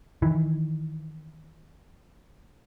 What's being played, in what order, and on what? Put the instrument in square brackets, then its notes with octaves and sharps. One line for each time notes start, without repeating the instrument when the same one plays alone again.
[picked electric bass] D#3 E3